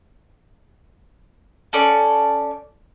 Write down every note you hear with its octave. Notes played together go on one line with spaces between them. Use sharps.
C#4 A4 D5